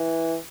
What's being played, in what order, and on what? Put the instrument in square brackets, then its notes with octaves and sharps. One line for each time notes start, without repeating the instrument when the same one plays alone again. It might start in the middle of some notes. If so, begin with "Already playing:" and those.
Already playing: [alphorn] E3